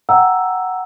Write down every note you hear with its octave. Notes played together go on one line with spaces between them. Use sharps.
F#5 G5 A#5 E6